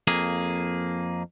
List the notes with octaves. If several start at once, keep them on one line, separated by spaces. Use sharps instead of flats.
F2 A#3 G#4